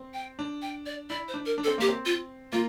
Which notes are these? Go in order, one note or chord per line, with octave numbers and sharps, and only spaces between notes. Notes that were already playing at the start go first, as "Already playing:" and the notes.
Already playing: C4
G5
D4
G5
D5
E4 D5
C5
D4
A#4
D4
A4
C4
A#3 G4
C4
F4
A#3 F4